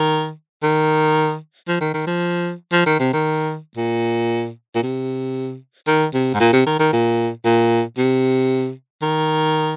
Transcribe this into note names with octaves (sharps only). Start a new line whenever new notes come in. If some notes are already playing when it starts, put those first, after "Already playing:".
Already playing: D#3
D#3
F3
D#3
D#3
F3
F3
D#3
C3
D#3
A#2
A#2
C3
D#3
C3
G#2
A#2
C3
D#3
D#3
A#2
A#2
C3
D#3